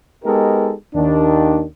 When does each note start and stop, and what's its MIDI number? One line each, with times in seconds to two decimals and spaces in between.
0.24 0.72 56
0.24 0.72 59
0.24 0.72 63
0.24 0.72 67
0.24 0.72 69
0.24 0.72 70
0.94 1.64 39
0.94 1.64 51
0.94 1.64 62